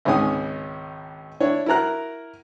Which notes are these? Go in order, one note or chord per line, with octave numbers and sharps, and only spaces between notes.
G#1 C#2 G#2 C#4 G#5 D#6
D4 E4 C#5
E4 F#4 A#4 A#5 F#6